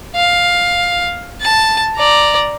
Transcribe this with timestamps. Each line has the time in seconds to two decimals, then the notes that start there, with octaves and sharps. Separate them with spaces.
0.16 F5
1.42 A5
1.97 D5 A#5